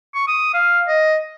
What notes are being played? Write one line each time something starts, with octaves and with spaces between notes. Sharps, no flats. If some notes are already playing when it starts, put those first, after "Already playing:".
C#6
D#6
F5
D#5